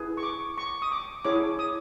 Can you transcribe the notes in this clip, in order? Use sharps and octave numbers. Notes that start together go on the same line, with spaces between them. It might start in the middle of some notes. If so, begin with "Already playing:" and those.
Already playing: E4 G#4 B4
C#6
D6
C#6
D#6
D6
E4 G#4 C#5 D6
D#6